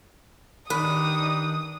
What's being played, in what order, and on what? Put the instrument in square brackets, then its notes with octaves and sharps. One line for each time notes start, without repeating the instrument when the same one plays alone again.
[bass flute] D#3 [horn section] G3 D4 D#4 [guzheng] B4 [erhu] D#6